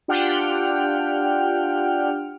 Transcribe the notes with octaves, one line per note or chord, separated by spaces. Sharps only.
D4 F4 G4 F#5 G5 F6